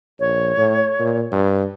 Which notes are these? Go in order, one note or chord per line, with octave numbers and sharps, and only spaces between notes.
A#1 C#5
A2
A#2
G2